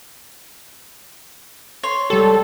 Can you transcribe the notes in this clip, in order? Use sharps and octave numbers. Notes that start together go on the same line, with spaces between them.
C#5 C6
G3 G#3 G4 A4